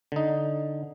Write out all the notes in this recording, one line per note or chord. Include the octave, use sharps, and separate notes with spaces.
D3 D#4